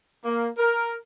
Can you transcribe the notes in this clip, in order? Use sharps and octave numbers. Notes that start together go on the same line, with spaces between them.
A#3
A#4